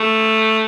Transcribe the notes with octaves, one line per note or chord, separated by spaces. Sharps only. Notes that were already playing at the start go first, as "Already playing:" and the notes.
Already playing: A3